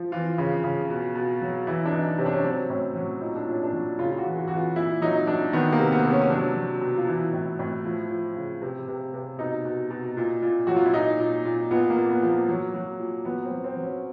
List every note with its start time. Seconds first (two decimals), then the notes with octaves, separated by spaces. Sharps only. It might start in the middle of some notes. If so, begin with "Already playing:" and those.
Already playing: F3
0.12 E3 F4
0.38 C#3
0.64 C#3
0.90 B2
1.15 B2
1.41 F#3
1.67 E3 E4
1.85 D4
1.92 E3 D#4
2.18 C3 C#4
2.26 D4
2.33 C#4
2.44 F#3 C4
2.70 A2 C#4
2.95 F#3 C#4
3.21 A#2 D#4
3.35 D4
3.47 A#2 C#4
3.63 D4
3.73 F#3
3.99 C#3 F4
4.11 F4
4.18 F#4
4.24 E3
4.37 F#4
4.48 E3 F#4
4.56 F4
4.76 A#2 E4
5.02 F#3 D#4
5.27 F#3 D4
5.53 D#3 B3
5.72 A#3
5.79 C3
5.92 B3
6.05 C3
6.11 C#4
6.22 C#4
6.30 F#3 D4
6.57 F#3
6.81 B2
6.97 F4
7.07 E3 E4
7.33 A2
7.59 A2
7.85 F3 E4
8.10 F3
8.36 C#3
8.62 C3
8.88 C3
9.14 C3
9.39 B2 D#4
9.65 B2
9.90 B2
10.17 A#2
10.42 A#2
10.67 F#3 F#4
10.76 F4
10.85 E4
10.94 A#2 D#4
11.20 A#2
11.45 A#2
11.71 A#2 B3
11.90 A#3
11.97 A#2
12.09 B3
12.23 F3
12.30 A#3
12.48 F#3
12.74 F#3
12.99 A#2
13.25 F#3 B3
13.45 C4
13.52 F#3
13.64 C4
13.77 F#3
13.84 C#4